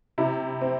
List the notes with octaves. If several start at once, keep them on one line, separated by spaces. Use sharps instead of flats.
C3 E4
C4